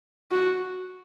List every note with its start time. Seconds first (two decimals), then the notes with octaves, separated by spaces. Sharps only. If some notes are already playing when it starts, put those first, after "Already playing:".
0.31 F#4